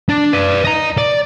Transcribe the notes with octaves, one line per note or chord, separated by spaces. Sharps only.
D4
B4 D5
D#5 A#5
D5